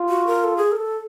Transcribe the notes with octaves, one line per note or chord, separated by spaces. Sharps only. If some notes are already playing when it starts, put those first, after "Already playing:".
Already playing: F4
F#4
A#4
A4
G#4
A#4
A4